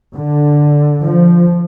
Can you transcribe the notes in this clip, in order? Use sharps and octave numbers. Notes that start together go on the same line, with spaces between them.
D3
F3